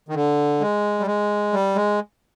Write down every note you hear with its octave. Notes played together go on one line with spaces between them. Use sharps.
D#3
D3
G#3
G3
G#3
G3
G#3